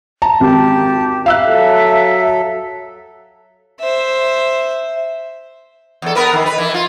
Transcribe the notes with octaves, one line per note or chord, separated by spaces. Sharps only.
A5 A#5
G#1 G4 A5
E5 F5 E6 F#6
F#3 A4
C5 E5
E2 A4
B3 A#4 B4
D#3
B4
E3
F4